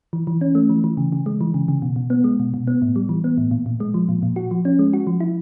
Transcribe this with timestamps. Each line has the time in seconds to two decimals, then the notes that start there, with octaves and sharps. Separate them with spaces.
0.13 E3
0.27 E3
0.41 C#4
0.55 A3
0.69 E3
0.84 E3
0.97 C#3
1.12 C#3
1.26 G#3
1.41 E3
1.54 C#3
1.68 C#3
1.82 B2
1.96 B2
2.10 B3
2.24 G#3
2.39 B2
2.54 B2
2.67 B3
2.82 A2
2.96 G3
3.09 E3
3.24 B3
3.38 A2
3.51 A#2
3.66 A#2
3.80 G#3
3.94 F3
4.09 A#2
4.23 A#2
4.36 F#4
4.51 F3
4.65 C#4
4.79 G#3
4.93 F#4
5.07 F3
5.20 E4